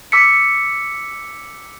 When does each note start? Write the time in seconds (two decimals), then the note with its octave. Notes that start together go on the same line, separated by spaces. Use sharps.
0.12 D6 E6 B6 C#7